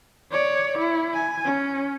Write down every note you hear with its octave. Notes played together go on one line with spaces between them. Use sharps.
C#5 D5
E4
G#5
C#4